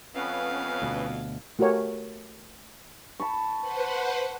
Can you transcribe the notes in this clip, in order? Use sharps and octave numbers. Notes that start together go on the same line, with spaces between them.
F2 B3 C#4 B4 F5
D2 B2
A3 F#4 G4 A#4 C#5 G#5
A5 B5 C#6
B4 C5 F#5